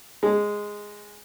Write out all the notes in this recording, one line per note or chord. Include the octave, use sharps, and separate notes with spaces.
G#3